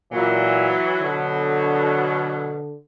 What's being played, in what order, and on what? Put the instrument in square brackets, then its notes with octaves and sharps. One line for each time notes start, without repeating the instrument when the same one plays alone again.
[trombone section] A#2 [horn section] E3 F#3
[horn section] B2 F#3 [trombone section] D3